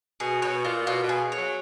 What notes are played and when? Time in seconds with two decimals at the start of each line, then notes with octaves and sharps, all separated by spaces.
0.20 B2 G#4
0.42 B2 C#5
0.64 A#2 F4
0.87 B2 F4
1.04 B2
1.09 G#4
1.32 C#5
1.37 F#3